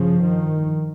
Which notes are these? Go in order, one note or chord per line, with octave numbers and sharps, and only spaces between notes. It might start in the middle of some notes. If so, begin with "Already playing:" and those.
Already playing: G2 C#3 F3
D#3